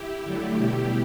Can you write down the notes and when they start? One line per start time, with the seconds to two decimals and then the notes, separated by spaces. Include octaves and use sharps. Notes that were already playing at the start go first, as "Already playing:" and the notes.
Already playing: E4 G4
0.23 D3 F#3 A3
0.57 B2 G3 E4 G4